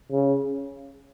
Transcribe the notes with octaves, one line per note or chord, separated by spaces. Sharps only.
C#3